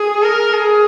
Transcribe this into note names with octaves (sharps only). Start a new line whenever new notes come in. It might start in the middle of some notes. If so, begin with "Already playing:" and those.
Already playing: G#4
A#4
G#4